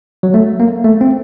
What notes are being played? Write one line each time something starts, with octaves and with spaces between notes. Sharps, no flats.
F#3
A3
A#3
A3
C4